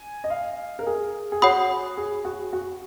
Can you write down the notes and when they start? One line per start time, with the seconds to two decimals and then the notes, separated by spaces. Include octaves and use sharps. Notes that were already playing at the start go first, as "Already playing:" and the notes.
Already playing: G#5
0.24 D#5
0.30 F5
0.79 A#4
0.87 G#4
1.32 G#4
1.42 F#4 C#5 F#5 B5 D#6
1.97 G#4
2.25 F#4
2.53 F#4